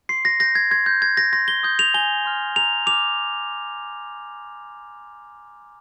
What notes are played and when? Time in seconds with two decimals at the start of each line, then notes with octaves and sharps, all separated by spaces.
0.09 C6 C7
0.25 A#6
0.40 G6 A#6
0.55 G#6
0.71 C6 G#6
0.86 G6
1.02 G6 G#6
1.17 A#6
1.33 C6 A#6
1.48 G7
1.63 D#6 G6
1.79 F7
1.94 G#5 G7
2.25 C6 F6
2.56 A#5 F7
2.86 D6 F7
2.91 F6